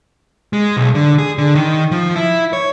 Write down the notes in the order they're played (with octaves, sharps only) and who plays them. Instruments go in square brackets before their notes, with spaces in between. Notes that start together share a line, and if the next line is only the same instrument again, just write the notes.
[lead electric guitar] G#3
B1
D3
G#4
D3
D#3
F3
E4
C#5